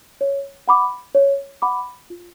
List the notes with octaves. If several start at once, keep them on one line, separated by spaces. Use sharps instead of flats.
C#5
F#5 B5 D6
C#5
F#5 B5 D6
F4